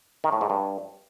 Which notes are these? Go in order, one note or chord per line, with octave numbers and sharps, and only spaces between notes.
D#3
A2
G#2
G2